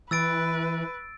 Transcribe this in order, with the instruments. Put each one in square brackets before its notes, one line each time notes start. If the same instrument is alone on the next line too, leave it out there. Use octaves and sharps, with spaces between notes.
[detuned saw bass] E3 [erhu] B4 [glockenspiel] E6 A6 D7